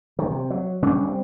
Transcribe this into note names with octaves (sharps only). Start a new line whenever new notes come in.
D#3
C3
F#3
C#3 G3 C#4 D4
G3 C4